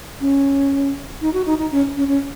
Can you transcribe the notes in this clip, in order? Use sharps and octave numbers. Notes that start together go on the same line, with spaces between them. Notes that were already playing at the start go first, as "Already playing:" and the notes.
C#4
D#4
F#4
D#4
D#4
C#4
C#4
C#4